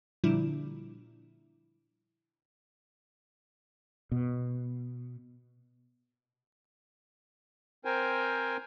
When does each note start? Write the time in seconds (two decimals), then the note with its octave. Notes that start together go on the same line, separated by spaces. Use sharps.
0.24 A#2 D3 F3 G3 D4 E4
4.11 B2
7.85 C4 A#4 C5 G5 G#5